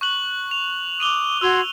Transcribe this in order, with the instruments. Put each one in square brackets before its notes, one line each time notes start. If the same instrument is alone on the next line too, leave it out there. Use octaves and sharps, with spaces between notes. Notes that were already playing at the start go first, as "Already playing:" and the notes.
[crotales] C#6 F#6 F#7
F7
[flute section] D6 D#6 [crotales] D#7 F7 G7
[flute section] F#4 C6 G#6 [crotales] E6 F7 G7